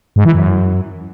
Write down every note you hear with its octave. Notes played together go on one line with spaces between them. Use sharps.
G#2
E3
F#2